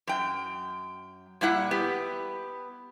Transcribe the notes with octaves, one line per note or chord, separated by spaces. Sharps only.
F#2 G5
A#2 G3 E4 F#5
B3 G4